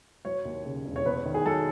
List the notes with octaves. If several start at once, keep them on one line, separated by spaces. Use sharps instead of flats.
F#3 C#5
D#2
C#3
E1
C#5
E2 B4
D#3
G#4
F#3 A4